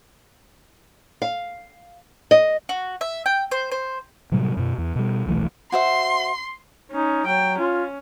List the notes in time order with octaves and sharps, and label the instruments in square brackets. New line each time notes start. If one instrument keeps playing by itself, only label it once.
[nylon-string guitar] F5
D#5
[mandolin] F#4
E5
G5
C5
C5
[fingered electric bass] A2 C3 F#3 G3
F#2 B2
E2
B2 G3
D#1 B1 E3 A3
[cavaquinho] F#4 C5 E5 [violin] C6
[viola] C#4 [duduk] D#4
[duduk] F#3 [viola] G5
[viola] C#4 [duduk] F4